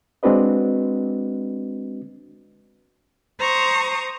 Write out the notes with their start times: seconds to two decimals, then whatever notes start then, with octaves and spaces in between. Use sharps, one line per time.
0.23 G#3 C4 D4 F#4 B4 D#5
3.39 C5 A#5 C#6 D#6